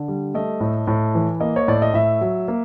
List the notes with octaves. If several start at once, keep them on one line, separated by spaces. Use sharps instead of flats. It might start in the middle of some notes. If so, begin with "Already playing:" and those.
Already playing: D3
G3
A3 D#5
A2
A2
E3
A#3 D#5
C#5
A2 D5
D#5
A2 E5
F#3
A#3